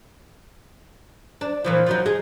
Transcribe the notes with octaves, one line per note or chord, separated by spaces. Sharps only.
D4
A#2 E3 F3
F3 F#3 D#4
D#4 G#4